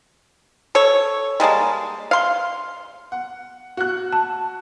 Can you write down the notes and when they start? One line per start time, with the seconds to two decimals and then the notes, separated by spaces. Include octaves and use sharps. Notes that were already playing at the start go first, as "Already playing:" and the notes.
0.75 A4 C#5
1.40 G3 G#3 A#3 A5
2.11 F5 C6
3.12 F#5
3.77 F#4 F#6
4.12 A5